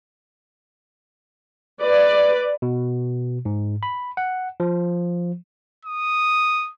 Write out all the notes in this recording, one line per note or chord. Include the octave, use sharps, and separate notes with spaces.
B4 D5
B2
G#2
B5
F#5
F3
D#6